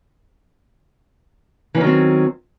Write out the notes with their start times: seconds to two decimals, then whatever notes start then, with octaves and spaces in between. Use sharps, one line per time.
1.75 E3
1.78 C#4
1.81 D#3
1.84 F#3
1.86 C4